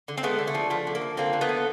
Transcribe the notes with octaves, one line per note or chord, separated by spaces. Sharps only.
D3
C4
G#3 A3 B3
D3
A3
F3
F3 A3
D3
A#3
F3
D3 A#3 C4
D3
A3 B3
D3